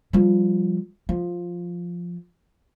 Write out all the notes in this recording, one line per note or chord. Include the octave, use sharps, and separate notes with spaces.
F3 G3
F3